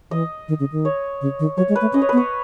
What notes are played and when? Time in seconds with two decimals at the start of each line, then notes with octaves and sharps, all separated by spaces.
0.11 E3 D#5
0.48 D#3
0.60 C#3
0.72 D#3
0.85 C#5
1.21 C#3
1.39 D#3
1.57 F#3 C#5
1.69 G#3
1.76 B4
1.81 A3
1.93 C#4 D#5
2.02 C#5
2.09 B3 B4
2.17 C#5